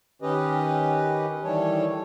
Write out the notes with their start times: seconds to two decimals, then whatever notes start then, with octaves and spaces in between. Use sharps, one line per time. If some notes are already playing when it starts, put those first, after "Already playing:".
0.22 D#3 C#4 G4 B4 D#5
1.43 D#3 E3 G3 A4 C#5